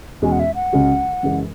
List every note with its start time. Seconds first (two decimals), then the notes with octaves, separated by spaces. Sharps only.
0.22 E2 B2 G#3 C#4 F#4 G#5
0.32 F#5
0.40 E5
0.55 F#5
0.73 C#2 C#3 G#3 C#4 F#4
1.23 F#2 C#3 E3 G#3 C#4